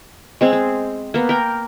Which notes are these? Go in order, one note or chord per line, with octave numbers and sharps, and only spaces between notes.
G#3 C4 G#4
C4
A#3 B3
A#4 G5